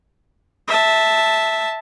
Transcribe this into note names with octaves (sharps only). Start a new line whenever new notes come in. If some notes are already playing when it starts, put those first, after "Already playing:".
E5 A5